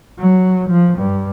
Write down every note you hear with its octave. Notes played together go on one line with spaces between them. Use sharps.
F#3
F3
G2